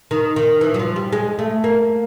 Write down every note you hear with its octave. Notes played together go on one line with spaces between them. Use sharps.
D#3
D#3
E3
F#3
F3
G3
G#3
A3
A#3